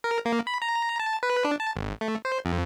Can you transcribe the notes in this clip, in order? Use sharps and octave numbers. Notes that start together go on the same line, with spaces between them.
A#4
A#3
B5
A#5
A5
B4
D4
A5
G#1
A3
C5
F2